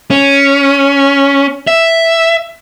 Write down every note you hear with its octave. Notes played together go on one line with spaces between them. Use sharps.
C#4
E5